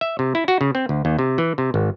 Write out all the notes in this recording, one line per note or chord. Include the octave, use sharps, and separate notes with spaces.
E5
C3
E4
F#4
C#3
C4
D2
D#2
C3
E3
C3
G#1